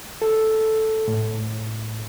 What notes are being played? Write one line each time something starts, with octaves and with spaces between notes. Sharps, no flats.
A4
A2